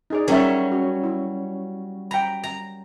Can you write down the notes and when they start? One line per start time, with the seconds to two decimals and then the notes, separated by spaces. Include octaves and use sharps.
0.10 D#4 G#4 D5
0.28 F#3 G3 C#4 A#4 C#5 E5
0.72 F#4
1.03 E4
2.11 G5 A#5 B5
2.43 A#5